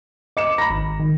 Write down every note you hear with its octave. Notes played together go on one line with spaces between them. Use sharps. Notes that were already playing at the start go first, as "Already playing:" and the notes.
D#5 D6 C#7 E7
A#5 B5 A#6
G#1
D#3